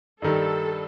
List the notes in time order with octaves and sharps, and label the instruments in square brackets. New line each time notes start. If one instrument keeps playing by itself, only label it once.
[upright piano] G2 D#3 G3 [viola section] A4